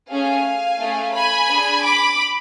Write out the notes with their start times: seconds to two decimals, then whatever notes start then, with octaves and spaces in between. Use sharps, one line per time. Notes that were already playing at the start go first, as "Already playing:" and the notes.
0.11 A3 C#4 G#4 F5 G#5
0.80 A3 C#4 G#4
1.15 G#5 B5
1.50 D4 G#4
1.84 B5 D6